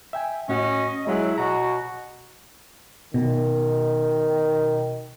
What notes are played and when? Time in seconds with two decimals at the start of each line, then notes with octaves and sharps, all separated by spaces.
0.13 E5 G5 G#5
0.49 A2 C#4 F#4 D#5
1.07 F#3 G#3 E4 F#4 G#4
1.38 B2 F#4 A#5
3.14 B2 D#3